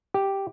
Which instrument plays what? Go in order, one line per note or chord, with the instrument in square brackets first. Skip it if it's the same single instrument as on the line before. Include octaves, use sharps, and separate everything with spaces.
[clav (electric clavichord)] G4